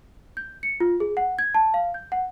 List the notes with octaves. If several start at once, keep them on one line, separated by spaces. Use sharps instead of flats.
G6
C#7
F4
G#4
F#5
G#6
A5
F5
G6
F#5